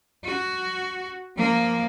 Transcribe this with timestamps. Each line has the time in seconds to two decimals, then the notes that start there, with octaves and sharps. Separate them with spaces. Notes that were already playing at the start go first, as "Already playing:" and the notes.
0.25 F#4
1.36 F3 A#3